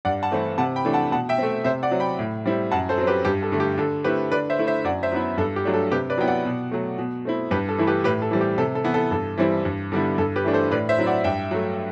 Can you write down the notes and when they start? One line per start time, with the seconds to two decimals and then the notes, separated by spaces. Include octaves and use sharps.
0.05 G2 D5 F#5
0.23 F#5 A5
0.31 E3 A3 C4 E4
0.58 C3 F#5 A5
0.76 G5 B5
0.85 E3 A3 D4
0.93 F#5 A5
1.11 B2 F#5 A5
1.29 E5 G5
1.38 A3 C4
1.64 C3 C5 E5
1.83 D5 F#5
1.91 F#3 C4
2.00 G5 B5
2.19 A2
2.46 G3 C4 E4
2.71 F#2 F#5 A5
2.89 A4 C5
2.98 F#3 C4
3.07 G4 B4
3.25 G2 G4
3.43 A4
3.52 D3 A3
3.60 G4
3.78 D3 A4
4.04 A3 C4 E4 G4 B4
4.32 D3 B4 D5
4.50 C5 E5
4.59 A3 E4
4.67 C5 E5
4.84 F#2 D5 F#5
5.03 C5 E5
5.12 F#3 B3 E4
5.38 G2 A4
5.56 G4
5.65 F#3 A3 D4
5.74 A4
5.91 C3 G4 B4
6.10 B4 D5
6.18 F#3 B3 E4 G5
6.27 D5 F#5
6.45 B2
6.71 F#3 A3
6.98 B2
7.25 A3 C4 E4
7.51 G2 G4 B4
7.69 A4
7.78 E3 A3 E4
7.87 G4 B4
8.04 A2 G4 B4
8.22 A4
8.31 E3 G3 C4
8.41 G4
8.58 C3 A4
8.75 A4
8.84 E3 B3 E4
8.94 A4
9.11 G2 A4
9.37 E3 G3 C4 E4
9.65 G2
9.92 D3 G3 B3 E4
10.18 G2 A4
10.36 G4 B4
10.44 E3 A3 D4
10.53 A4 C5
10.71 A2 B4 D5
10.89 C5 E5
10.98 F#3 C4 E4
11.06 D5 F#5
11.24 G2 E5 G5
11.51 F#3 A3